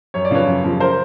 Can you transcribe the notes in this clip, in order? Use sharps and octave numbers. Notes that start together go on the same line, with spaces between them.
F#2 C#5
D5
C#3 F3 B4 C#5
F#2
C#3 F3
A#4 C5